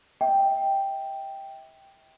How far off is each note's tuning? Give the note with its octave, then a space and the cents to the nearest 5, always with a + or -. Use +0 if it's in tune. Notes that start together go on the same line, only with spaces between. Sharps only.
E5 -40 G5 +0